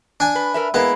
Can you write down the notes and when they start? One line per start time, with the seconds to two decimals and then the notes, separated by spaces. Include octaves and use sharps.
0.20 D4 G#5
0.35 B4
0.54 A#4 B4 E5
0.74 G#3 A#3 B3 E4